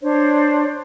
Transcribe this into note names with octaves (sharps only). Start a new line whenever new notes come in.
D4 C5 C#5